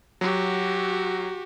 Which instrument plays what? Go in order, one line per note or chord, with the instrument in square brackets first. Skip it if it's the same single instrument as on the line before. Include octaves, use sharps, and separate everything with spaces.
[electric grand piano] F#3 [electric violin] F#4 G4